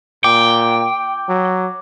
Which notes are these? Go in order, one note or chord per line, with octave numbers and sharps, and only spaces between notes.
A#2 G5 D6
F#3